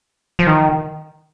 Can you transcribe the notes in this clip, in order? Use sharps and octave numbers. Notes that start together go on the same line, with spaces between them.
F3
D#3